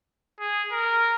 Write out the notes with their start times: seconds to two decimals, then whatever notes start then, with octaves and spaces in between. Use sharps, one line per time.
0.40 G#4
0.72 A#4